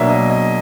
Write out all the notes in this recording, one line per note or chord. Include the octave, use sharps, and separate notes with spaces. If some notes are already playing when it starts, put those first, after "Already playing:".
Already playing: B2 F#3 A#3 D4 E5
D#5
D#5